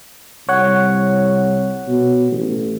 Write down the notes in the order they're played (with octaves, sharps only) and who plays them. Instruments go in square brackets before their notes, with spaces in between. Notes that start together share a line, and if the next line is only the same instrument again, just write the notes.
[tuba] C2 [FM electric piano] C#5 F#5
[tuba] B2
A1